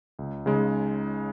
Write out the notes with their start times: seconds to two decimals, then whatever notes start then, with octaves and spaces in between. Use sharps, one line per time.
0.19 C#2
0.46 C#3 G#3 D#4